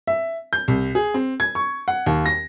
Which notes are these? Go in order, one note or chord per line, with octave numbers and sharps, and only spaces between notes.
E5
G6
C2
G#4
C4
G#6
C#6
F#5
D#2
A#6